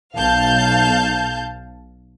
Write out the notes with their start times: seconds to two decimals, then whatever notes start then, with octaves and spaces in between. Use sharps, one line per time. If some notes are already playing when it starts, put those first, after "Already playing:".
0.16 B1 F5 A5 G6